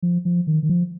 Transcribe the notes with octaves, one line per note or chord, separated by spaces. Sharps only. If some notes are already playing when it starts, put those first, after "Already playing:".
F3
F3
D#3
D#3
F3